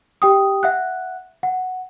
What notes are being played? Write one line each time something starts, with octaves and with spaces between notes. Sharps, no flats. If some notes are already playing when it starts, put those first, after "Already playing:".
G4 G5 D#6
E5 F#5 F#6
F#5